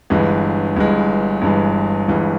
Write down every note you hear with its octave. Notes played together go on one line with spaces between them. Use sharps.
G1 G2 E3 G#3
G1 G2 E3 G#3
G1 G2 E3 G#3
G1 G2 E3 G#3